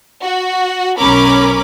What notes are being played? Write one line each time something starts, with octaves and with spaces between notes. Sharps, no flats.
F#4
B1 C#4 A#4 B5 D6